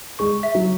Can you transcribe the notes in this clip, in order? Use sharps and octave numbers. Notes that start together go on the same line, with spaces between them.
G#3 C#6
E5
F#3